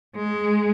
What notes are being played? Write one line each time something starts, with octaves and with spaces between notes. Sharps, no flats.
G#3